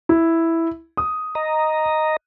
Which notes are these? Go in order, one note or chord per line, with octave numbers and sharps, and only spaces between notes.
E4
D#6
D#5 A#5